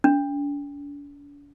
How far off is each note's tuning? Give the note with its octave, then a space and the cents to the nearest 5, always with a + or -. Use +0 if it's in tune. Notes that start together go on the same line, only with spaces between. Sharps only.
D4 -45